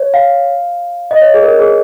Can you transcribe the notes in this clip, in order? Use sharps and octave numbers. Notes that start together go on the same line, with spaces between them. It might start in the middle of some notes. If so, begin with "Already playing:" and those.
Already playing: C#5
F5
D#5
C#5
G#4
A#4
G#4